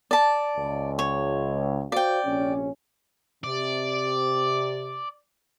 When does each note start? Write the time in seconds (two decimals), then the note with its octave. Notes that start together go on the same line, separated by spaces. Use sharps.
0.11 D5 A5
0.57 C#2
0.99 C#5
1.92 F#4 C5 D5 F5 G5
2.25 A#1 C3 C#4
3.44 C3 D5